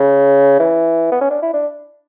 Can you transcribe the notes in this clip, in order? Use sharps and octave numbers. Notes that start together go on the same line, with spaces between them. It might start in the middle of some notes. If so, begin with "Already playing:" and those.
Already playing: C#3
E3
B3
C#4
D4
E4
D4